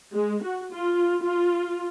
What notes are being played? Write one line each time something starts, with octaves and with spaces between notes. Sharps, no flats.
G#3
F#4
F4
F4